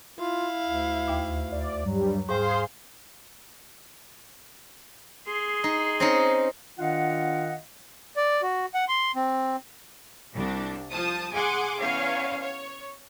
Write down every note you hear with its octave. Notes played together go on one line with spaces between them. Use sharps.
E4 F4 F5
D2
D#2 E5 D6
D5
G2 F#3 G3
G#2 G3 G#4 C5 F5 C6
G#4 C6
D#4
C4 C#4 D#4
D#3 D4 F4 D#5 F5 F#5
D5
F#4
F#5
C6
C4
C2 D4
F3 A5 D#6
G#4 F#5 G#5 C6 D6
E2 C#4 C#5 F5
C#5